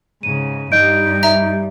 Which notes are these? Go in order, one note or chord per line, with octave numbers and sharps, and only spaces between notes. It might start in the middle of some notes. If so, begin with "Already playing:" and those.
G#2 C#3 D#7
G2 G3 D#4 D#5 G6 D7
E5 A#5